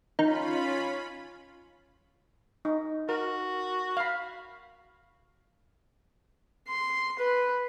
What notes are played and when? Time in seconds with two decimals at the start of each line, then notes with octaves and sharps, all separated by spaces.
0.19 D#3 C#4 D#4 F4 B5
2.65 D#4
3.09 F#4 A#4
3.97 F5 B5
6.67 C6
7.19 B4